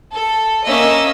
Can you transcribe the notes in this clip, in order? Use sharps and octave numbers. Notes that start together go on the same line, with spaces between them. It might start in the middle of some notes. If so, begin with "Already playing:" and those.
A4
A#3 C#4 D#5 E5 E6